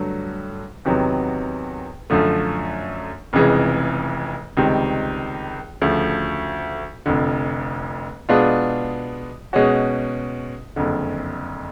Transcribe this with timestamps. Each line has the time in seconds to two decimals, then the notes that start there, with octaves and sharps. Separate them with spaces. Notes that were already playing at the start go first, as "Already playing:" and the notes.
Already playing: G2 D3 F#3 A3
0.85 E2 C3 D#3 F#3 B3
2.10 F#2 D3 F3 A3
3.33 F1 F2 C#3 E3 G#3
4.57 C#2 C3 D#3 G3 C4
5.82 D2 C#3 F3 A3
7.06 F1 F2 D3
8.29 B2 G#3 B3 D4 F4
9.53 B2 G#3 C#4 F#4
10.76 F#1 F2 D3